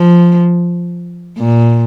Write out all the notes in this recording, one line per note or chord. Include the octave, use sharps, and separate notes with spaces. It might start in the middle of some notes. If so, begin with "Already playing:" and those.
Already playing: F3
A#2